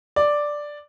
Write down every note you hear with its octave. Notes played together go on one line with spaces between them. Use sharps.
D5